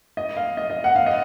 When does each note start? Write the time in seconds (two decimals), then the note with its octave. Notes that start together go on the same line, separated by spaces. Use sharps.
0.17 D#5
0.37 F5
0.57 D#5
0.70 D#5
0.84 F#5
0.96 F5
1.06 D#5